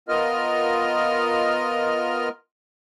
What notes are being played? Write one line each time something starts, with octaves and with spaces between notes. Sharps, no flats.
B3 F4 A#4 D#5 F6